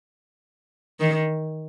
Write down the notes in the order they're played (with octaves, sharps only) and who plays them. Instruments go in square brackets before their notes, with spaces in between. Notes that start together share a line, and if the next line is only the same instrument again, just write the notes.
[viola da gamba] D#3